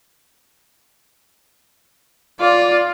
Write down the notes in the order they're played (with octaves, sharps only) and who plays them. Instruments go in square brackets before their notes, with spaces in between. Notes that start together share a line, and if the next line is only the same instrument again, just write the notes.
[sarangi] F4 [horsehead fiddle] D5